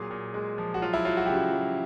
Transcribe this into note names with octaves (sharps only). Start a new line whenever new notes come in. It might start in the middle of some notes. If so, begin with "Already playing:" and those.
Already playing: A#2 F#3 G#4
A#2
G#3
F3
F#4
F#3 F4
E4
F#3 F4
F#4
G4
C#3 F#4
F#3